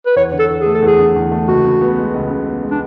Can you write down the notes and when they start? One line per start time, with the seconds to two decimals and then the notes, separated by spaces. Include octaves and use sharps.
0.06 B4
0.16 E2 C#5
0.32 D3
0.39 A4
0.49 E2
0.61 G#4
0.66 A3
0.75 A4
0.82 E2
0.87 G#4
0.98 D3
1.16 E2
1.32 A3
1.48 C#2 F#4
1.65 C#3
1.81 B3
1.98 G#3
2.14 C#2
2.30 C#3
2.47 B3
2.64 G#3
2.71 D4